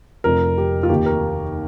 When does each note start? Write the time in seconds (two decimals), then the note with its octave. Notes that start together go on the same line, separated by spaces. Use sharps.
0.24 F1 F2 C3 F3 A#4
0.57 G4
0.83 F4
0.89 D#2 D#3 G4
1.06 A#4